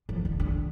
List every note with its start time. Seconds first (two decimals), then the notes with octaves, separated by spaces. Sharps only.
0.09 F3
0.25 D3
0.40 D3